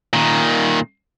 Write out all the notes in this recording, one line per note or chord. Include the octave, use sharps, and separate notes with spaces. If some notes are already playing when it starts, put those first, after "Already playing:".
A#2 D#3